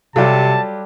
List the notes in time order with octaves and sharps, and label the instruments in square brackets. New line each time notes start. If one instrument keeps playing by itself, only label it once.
[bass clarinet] C3 [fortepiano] F#3 F4 G4 [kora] G3 A4 [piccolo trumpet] A5